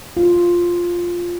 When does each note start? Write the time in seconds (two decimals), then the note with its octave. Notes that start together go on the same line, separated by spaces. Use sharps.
0.17 F4